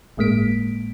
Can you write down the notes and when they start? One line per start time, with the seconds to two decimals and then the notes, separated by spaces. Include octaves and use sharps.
0.17 G1 A2 G#3 A#3 B6 D7